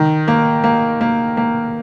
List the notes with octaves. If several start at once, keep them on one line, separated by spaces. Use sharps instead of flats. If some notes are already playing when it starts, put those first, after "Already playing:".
Already playing: D#3
A#3
A#3
A#3
A#3